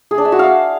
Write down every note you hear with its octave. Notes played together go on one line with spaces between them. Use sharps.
G#4
D4
E5
F#4
F5